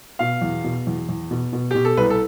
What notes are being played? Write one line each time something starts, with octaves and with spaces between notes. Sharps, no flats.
B2 F5
E2
B2
E2
E2
B2
B2
B2 G4
A4
C2 B4
A4